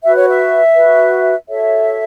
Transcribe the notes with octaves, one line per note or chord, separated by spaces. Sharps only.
F#4 B4 E5
C#5
E5
F#4 B4
F#4 A4 C#5 E5